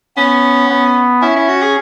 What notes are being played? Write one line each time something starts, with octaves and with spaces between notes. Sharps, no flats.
B3 C#4
B3
C#4 E4
E4
F#4
G#4